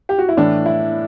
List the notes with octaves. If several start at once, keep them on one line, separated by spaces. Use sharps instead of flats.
G4
F#4
E4
A2 E3 D4
E4